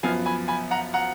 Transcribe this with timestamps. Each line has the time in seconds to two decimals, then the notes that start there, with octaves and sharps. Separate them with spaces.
0.03 F#2 F3 B3 F5 G#5
0.26 G#5 B5
0.48 G#5 B5
0.71 F#5 A#5
0.94 F#5 A#5